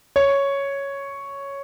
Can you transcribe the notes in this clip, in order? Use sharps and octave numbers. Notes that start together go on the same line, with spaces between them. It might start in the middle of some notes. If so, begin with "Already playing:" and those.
C#5